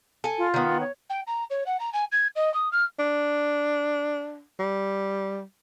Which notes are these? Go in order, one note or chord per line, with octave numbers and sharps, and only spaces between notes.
A4 G#5
F4
D#3 B3
C#5
G5
A#5
C#5
F#5
A#5
G#5
G#6
D#5
D#6
F6
D4
G3